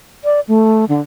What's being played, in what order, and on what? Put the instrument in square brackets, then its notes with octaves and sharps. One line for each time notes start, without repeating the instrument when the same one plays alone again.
[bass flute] D5
A3
D3